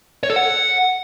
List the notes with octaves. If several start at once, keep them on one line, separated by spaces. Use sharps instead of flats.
C#5
A4
F#5